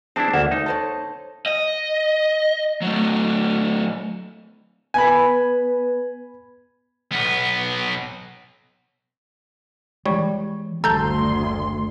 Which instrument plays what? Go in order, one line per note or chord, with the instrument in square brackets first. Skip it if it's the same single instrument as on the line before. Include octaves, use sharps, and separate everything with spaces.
[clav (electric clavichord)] C4 D4 E4 [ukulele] G#4 A5
[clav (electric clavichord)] D2 A#3 E5 [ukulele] F#5
[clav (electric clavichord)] D#4
[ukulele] A4 C5 C#5
[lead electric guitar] D#5
F#3 A3
[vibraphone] B3 B4 [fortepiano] G#5 B5
[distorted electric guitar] B1 B3
[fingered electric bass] E3 G#3 [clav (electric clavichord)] G3 C#5
[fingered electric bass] F#1 G3 A3 [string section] D2 C6 [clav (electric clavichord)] A4 [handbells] A#5 G6